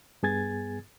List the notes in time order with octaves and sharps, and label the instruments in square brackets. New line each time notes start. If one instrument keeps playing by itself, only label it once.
[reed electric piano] G2 B3 G#4 G#5 G#6 A6